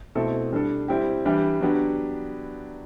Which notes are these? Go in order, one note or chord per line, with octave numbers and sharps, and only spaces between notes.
B2 A3 C4 E4 A4
G3 D4 A4
G3 C4 E4 G4
E3 G3 D4 G4
F#3 B3 D4 G4